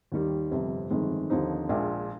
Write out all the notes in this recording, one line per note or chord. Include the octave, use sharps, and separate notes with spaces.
D#2 D#3 G3
G1 F2 C3
G1 F2 D#3 G#3
D#2 D3 F3 C4 D#4
A#1 A#2 G#3 D4